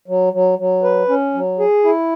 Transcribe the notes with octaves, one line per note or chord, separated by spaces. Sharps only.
F#3
F#3
F#3
B4
C#4
F#3
G#4
E4